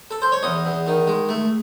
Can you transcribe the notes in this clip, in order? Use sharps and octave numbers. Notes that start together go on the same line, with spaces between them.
A4
C5
C#5
E2 D#5
E2
D#3
G#3
A3